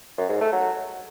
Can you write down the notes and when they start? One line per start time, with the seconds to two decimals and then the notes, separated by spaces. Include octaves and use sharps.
0.18 F#2
0.29 G#2
0.41 A3
0.52 F#3